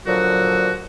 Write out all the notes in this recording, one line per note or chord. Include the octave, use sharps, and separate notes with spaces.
A#2 D3 F3 F#3 F#4